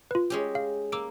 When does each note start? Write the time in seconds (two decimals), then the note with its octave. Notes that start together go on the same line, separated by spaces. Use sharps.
0.11 F4 B4
0.30 G#3 C#4 G4
0.55 F5
0.92 A#3 D6 E6 D7